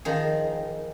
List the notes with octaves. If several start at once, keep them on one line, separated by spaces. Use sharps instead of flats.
D#3 F3 G#4